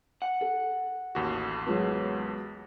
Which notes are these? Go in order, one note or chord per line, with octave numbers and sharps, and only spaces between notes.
F#5
A4
A1 D#2 F#4
F#3 G#3 B3